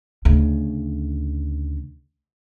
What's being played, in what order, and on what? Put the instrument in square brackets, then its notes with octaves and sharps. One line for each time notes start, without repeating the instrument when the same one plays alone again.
[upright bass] D2 C#3